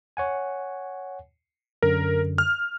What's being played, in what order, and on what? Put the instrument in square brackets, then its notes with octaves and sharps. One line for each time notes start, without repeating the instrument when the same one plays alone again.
[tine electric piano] C#5 F#5 G#5
[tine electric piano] F#2 D3 [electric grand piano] A#4
[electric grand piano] F6